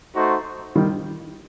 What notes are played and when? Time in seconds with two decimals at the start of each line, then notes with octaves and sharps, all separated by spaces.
0.15 A3 D#4 F#4 C5
0.75 D#3 G3